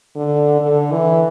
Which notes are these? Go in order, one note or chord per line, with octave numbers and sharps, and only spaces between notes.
D3
D3
E3